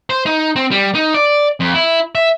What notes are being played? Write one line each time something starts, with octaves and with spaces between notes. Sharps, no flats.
C5
D#4
C4
G3
D#4
D5
F2
E4
E5